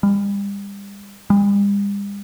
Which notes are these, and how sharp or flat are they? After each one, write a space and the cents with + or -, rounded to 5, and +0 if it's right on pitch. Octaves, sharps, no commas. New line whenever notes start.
G3 +35
G3 +45